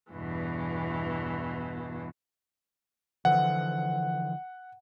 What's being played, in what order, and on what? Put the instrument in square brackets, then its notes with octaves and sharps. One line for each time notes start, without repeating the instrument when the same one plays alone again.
[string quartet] E2 G2 B2 E3
[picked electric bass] D3 E3 F3 [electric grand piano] F#5